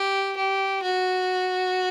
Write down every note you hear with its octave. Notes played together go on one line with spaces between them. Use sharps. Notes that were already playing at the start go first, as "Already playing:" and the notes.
Already playing: G4
G4
F#4